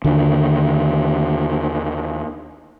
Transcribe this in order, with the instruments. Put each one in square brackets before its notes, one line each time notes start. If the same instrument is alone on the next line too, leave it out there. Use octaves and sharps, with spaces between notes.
[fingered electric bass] D#2 D3 D#3